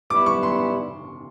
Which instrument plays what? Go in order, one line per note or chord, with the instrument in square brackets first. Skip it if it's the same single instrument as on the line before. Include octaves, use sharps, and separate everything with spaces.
[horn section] G3 B3 E4 [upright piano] D6
[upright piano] C#6
C6